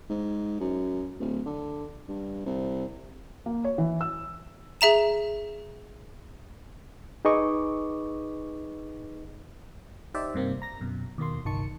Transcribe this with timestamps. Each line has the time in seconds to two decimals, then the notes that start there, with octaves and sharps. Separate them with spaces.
0.10 G#2
0.60 F#2
1.19 D1
1.46 D3
2.08 G2
2.46 C2
3.46 A#3
3.64 C#5
3.78 E3
4.01 E6
4.81 G#4 E5 A#5 E7
7.25 D#4 G#4 B4 D#5 C#6 D6
10.14 D#4 G4 C5 D5 E5
10.34 G2 C3 A#3 C4
10.62 A#5 A#6
10.81 F#2 B2
11.18 D#2 B2 A#3 C6
11.45 G1 C2 D#3 A5 C#6 C#7